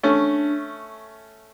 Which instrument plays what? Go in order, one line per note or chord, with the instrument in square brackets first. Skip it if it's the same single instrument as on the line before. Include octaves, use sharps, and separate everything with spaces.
[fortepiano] A3 C#4 [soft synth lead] D4